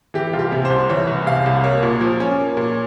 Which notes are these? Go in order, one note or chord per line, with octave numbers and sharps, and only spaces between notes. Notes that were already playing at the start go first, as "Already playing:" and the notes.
E3 G4
C2 F4
G4
C3
C5
C2
E3 C#5
C2
C3 F5
C2
A#3 C#5
A#2
F3
C#4
A#3
A#2